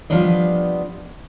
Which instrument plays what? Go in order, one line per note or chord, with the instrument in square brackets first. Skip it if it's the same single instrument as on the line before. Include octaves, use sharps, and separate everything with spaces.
[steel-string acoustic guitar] F3 G3 B3 D4 D#5